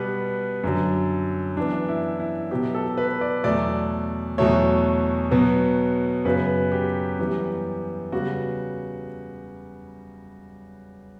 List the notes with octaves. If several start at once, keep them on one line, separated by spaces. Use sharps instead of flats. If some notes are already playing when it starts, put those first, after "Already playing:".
Already playing: B2 G3 B3 B4
F#2 D3 F#3
F#2 E3 B3 D4
E4
E4
B2 F#3 B3 G4
A4
B4
D5
E2 B2 F#3 A3 D5
E2 B2 F#3 A3 C#5
B2 F#3 B3
F#2 C#3 F#3 B3 B4
G4
F#2 E3 G3 B3 G4
C#3 G3 B3 F#4